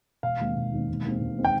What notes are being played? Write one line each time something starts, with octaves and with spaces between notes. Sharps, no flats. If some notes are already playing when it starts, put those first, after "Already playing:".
E1 F5
D#2 D#3 G#3 C4
E1
D#2 D#3 G#3 C4
E1
D#2 D#3 G#3 C4
E1
D#3 G#3 C4
G5